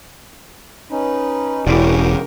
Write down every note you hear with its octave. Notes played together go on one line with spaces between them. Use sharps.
C#4 D#4 B4
E1 C#3 C#4 E4 F#4 G4 A#4 D5